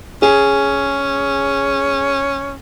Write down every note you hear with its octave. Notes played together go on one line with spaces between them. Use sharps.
C#4 G#4 G#5